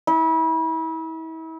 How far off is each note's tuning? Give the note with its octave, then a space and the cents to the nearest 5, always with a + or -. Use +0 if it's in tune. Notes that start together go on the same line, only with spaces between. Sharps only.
E4 -35